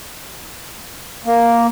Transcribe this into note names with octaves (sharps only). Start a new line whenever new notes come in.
A#3